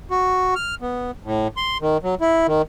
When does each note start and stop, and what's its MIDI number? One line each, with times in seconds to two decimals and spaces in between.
0.11 0.54 66
0.55 0.75 89
0.82 1.11 59
1.24 1.48 45
1.57 1.78 84
1.81 1.98 51
2.03 2.15 54
2.21 2.47 64
2.47 2.62 51